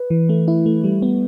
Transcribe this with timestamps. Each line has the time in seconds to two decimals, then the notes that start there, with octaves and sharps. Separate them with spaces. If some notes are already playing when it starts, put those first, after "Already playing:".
Already playing: B4
0.10 E3
0.29 A3
0.48 E4
0.66 A3
0.84 G3
1.02 B3